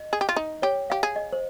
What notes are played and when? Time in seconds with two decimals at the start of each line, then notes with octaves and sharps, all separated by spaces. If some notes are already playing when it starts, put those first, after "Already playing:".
Already playing: D#5
0.13 G#4
0.21 G4
0.29 F4
0.36 D#4
0.62 G4 C#5
0.90 G4 F5
1.03 G#4
1.16 D#5
1.32 C5